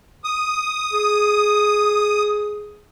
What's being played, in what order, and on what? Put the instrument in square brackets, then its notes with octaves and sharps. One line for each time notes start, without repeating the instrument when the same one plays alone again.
[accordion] D#6
[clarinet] G#4